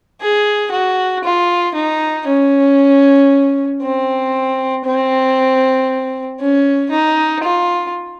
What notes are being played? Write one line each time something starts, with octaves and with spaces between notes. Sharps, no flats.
G#4
F#4
F4
D#4
C#4
C4
C4
C#4
D#4
F4